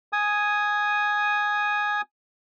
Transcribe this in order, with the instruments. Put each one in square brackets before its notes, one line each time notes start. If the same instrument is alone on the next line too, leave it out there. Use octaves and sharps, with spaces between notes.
[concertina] G#5 D#6